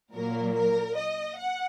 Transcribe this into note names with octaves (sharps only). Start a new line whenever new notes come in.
A#2 F#3 A#3 A#4
A#4
D#5
F#5